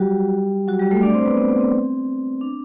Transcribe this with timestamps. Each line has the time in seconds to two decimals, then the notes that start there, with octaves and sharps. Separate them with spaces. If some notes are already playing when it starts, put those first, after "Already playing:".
Already playing: F#3 G3 F#4 G4
0.68 F#3 F#4
0.80 G3 G4
0.91 A3 A4
1.03 D4 D5
1.14 C4 C5
1.26 B3 B4
1.37 C4
1.49 B3
1.60 C4
2.41 D4